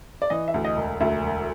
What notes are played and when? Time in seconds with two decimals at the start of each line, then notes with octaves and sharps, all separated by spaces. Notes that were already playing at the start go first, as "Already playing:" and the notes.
0.22 D5
0.30 E3 D#5
0.48 E5
0.54 D2
0.64 D#5
0.77 E1
1.00 D2 E5
1.23 E1